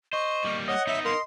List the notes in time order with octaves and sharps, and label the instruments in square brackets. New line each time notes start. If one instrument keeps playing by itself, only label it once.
[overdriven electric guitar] C5 [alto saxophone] D#5 [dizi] C#6
[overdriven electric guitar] G3 A#3
[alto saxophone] C#5 [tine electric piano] D#5 [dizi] F#5
[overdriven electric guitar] B3 D#4 [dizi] E5
[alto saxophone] A#4 [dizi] C6